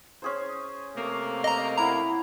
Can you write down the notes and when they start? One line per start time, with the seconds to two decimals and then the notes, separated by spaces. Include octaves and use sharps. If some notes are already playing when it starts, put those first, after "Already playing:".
0.22 C#4 G#4 C5
0.95 C3 A3 A#3
1.44 D#5 A#5
1.78 E4 F#5 A#5